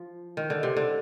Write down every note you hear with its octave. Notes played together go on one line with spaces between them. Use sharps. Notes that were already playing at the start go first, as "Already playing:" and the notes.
Already playing: F3
D#3
D3
C3
D3